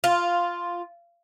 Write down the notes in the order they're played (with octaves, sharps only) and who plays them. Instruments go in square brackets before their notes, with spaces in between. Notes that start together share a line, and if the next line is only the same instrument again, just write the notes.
[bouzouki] F4